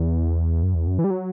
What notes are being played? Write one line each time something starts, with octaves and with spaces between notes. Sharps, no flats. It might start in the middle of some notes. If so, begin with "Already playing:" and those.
Already playing: E2
F#2
E2
F#2
E3
G3
F#3